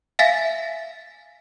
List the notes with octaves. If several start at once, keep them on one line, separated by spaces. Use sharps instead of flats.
E5 F5 G#5 A6 B6